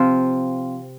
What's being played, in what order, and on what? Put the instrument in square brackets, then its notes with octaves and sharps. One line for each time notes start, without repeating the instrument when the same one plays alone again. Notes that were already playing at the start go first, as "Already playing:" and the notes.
Already playing: [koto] C3 F3 C4 F4